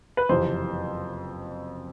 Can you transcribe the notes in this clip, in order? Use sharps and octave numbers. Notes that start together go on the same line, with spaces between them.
B4
F#1 F2 C3 E3 C5